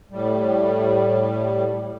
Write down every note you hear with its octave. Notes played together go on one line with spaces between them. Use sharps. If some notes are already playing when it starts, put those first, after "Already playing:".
A2 G3